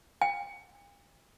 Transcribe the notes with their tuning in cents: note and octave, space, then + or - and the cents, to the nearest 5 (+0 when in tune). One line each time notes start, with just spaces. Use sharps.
G5 +45